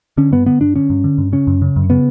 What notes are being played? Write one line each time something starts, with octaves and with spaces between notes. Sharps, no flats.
D3 C#4
G2 B3
D3 B3
G2 D4
D3 C#4
G2
D3
G2
C#3 C#4
F#2
C#3
F#2
C#3 B3